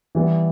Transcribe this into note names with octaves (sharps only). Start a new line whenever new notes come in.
E3 G3 B3